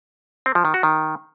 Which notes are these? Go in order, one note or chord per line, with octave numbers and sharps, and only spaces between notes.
C4
F3
D#3
F#4
D#3